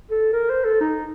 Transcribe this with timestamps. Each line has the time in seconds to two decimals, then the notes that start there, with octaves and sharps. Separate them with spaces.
0.11 A4
0.33 A#4
0.50 C5
0.65 A4
0.80 D#4